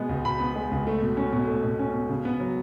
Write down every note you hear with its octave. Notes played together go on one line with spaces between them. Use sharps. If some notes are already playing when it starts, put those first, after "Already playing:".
Already playing: B2 G#3 B3
C#2
B2 B5
B3
G#3
C#2
A3
B2
C#4
B2
A3
B2
C#4
B2
C#3
B3
F#3